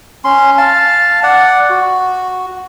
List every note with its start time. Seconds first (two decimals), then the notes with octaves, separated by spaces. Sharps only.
0.24 C#4 C6
0.58 F5 A5
1.23 D5 F#5
1.70 F#4